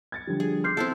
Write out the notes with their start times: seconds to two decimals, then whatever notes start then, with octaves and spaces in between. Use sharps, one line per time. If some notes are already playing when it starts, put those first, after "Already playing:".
0.12 G#6 A6 C#7
0.27 D3 F3 G3
0.40 G#4
0.64 C6 D6 F6 G6 C7
0.77 C4 E4 A4